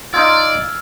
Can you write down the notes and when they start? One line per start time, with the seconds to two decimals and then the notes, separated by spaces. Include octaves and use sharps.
0.14 D#4 F4 D5 E6 F6 G#6